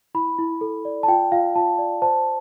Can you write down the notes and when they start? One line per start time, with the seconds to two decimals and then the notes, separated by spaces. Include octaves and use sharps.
0.15 E4 B5
0.38 E4
0.61 A4
0.85 D5
1.03 A5
1.08 F4 G5
1.32 F4 F5
1.55 F4 A5
1.79 D5
2.02 C5 A5